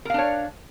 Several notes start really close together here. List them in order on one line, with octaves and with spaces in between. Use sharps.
A#4 F5 D4 C#5